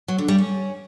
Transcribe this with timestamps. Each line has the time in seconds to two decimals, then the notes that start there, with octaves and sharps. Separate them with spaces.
0.08 F#3
0.18 D3
0.28 G3
0.38 C#4